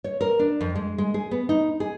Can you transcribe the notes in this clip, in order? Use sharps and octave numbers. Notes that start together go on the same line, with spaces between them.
C#5
A#4
D4
F2
G#3
G#3
G#4
B3
D#4
G#4